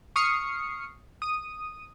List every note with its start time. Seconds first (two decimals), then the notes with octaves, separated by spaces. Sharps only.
0.16 C#6 D#6 F6 C7 C#7
1.22 D#6 D#7